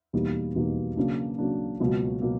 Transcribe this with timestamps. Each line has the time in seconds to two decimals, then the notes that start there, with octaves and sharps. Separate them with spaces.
0.13 E2 B2 G3 A#3 D#4
0.55 E2 B2 G3 A#3 D#4
0.96 C#3 F#3 A#3 D4
1.38 C#3 F#3 A#3 D4
1.80 C#2 B2 F#3 A#3
2.21 B2 F#3 A#3